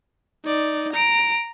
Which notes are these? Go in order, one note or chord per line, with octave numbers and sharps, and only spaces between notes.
D#4 D5
A#5 D7